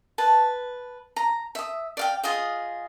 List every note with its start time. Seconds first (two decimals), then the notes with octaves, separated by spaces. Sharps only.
0.18 B4 A5
1.16 A#5
1.55 E5 D#6
1.97 D5 F5 G5
2.23 F4 G#4 D#5 F5